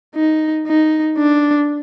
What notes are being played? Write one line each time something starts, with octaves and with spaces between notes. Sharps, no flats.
D#4
D#4
D4